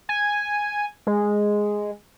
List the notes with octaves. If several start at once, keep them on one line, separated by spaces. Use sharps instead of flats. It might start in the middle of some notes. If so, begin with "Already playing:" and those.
G#5
G#3